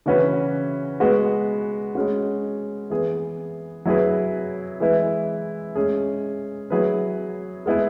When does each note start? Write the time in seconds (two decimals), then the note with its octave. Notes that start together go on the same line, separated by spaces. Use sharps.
0.06 C#3 E3 C#4 F#4 B4
1.00 G#3 B3 F#4 B4
1.95 G#3 C#4 F#4
2.90 E3 B3 G#4
3.85 F#3 E4 G#4 B4
4.80 E3 G#3 E4 B4
5.75 G#3 C#4 G#4
6.70 F#3 E4 G#4 B4
7.66 G#3 B3 E4 G#4 B4